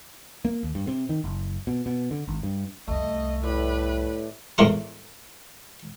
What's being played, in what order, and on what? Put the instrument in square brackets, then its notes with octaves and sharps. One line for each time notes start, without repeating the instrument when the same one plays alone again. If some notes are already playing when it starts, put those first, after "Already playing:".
[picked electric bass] A#3
D#2
G2
C3
D#3
F#1
B2
B2
D3
G#1
G2
[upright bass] C2 F2 [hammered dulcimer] A3 [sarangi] D#5
[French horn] A2 [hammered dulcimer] G3 [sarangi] B4
[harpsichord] E2 A2 E3 A#4 C#6